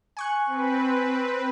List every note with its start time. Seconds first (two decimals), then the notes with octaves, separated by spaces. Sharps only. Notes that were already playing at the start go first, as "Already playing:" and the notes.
0.17 G#5 C#6 F#6
0.46 C4 B4